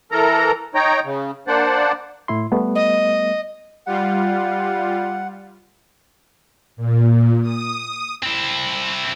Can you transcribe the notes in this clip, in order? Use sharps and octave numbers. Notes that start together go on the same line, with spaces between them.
E3 A4 A#4 A#5
D#4 C#5 G5 A#5
C#3
A#3 D4 C5 D5 F#5
A2 E4 C6
G3 A3 B3
D#5
G3 F4 F#5
A#2
D#6
C4 E4